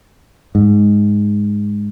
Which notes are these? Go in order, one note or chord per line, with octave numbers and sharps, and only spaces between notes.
G#2